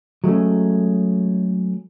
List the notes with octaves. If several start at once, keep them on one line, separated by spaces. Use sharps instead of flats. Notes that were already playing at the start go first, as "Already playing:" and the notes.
F#3 G#3 A3 C#4